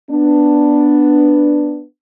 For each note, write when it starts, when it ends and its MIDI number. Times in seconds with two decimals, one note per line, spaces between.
0.10 1.83 59
0.10 1.83 62